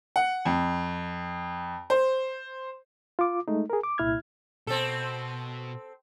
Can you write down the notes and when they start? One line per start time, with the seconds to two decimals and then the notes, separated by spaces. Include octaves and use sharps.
0.16 F#5
0.45 F2
1.90 C5
3.19 F4 D6
3.48 G#3 A3 D#4
3.70 G#4 A#4
3.84 D6
3.98 C2 A#2 E4 F6 G#6
4.67 B2 C4 A4